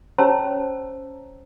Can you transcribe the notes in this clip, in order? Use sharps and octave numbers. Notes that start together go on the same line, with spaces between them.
C#4 C5 C#5 A5 A#5 E6